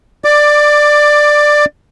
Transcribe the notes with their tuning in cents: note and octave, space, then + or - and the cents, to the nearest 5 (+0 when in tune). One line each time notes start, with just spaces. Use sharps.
D5 +15 D6 +0